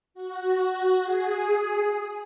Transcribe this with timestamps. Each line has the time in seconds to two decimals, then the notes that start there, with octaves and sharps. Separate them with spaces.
0.14 F#4
1.03 G#4